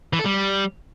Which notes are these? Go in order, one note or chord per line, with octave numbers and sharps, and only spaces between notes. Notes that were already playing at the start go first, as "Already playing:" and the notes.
E3
A4
G3